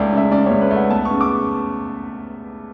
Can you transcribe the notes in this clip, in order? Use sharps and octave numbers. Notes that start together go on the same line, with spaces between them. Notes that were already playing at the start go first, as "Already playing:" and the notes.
Already playing: C#2 A3 D5
C#3 E5
C#3 D5
C#2 C#5
B4
A3
F#5
B3 A5
C#6
C#3
D6